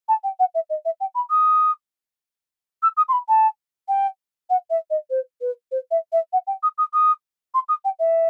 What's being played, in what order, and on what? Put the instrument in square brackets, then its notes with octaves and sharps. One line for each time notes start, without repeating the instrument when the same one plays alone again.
[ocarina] A5
G5
F#5
E5
D#5
E5
G5
B5
D#6
E6
D#6
C6
B5
A5
G5
F#5
E5
D#5
C5
B4
C5
E5
E5
F#5
G5
D#6
D#6
D#6
C6
D#6
G5
E5